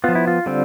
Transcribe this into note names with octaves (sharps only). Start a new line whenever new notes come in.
F3 B3 F4
E4
F4
D3 G3 C4